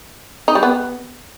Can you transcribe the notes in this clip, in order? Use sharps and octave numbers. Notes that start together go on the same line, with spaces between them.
D#4
G3
B3